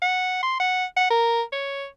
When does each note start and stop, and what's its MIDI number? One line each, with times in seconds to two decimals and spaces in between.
0.02 0.41 78
0.43 0.56 84
0.59 0.85 78
0.96 1.07 78
1.10 1.42 70
1.52 1.86 73